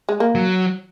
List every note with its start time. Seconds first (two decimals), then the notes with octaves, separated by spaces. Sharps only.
0.09 G#3
0.20 A#3
0.35 F#3